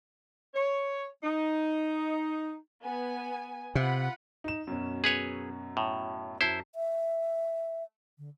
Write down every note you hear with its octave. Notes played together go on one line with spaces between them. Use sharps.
C#5
D#4
B3 G#5
C3 F4 F#5 B5
D#4 E7
F#2 B2 C#4
G#4 B4 C#5
A2
F#2 E4 C5 A5
E5
D3